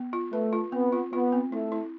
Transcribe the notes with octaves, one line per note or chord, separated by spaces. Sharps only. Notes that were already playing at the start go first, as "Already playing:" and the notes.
Already playing: B3
F4
A3 B4
F4
B3 C4
F4
B3 F4
C4
A3 E4
E4